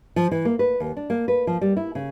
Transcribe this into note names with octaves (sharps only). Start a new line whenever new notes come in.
F3
E3
A#3
B4
D#2
D4
A#3
B4
F3
G3
E4
C#3